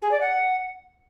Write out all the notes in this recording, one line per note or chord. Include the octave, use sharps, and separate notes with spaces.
G#4
D5
F#5